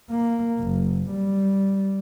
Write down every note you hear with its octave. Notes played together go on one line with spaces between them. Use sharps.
A#3
F#1
G3